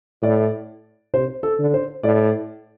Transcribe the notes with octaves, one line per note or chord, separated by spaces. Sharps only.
A2 D5
C3 C5
A4
D3
C5
A2 D5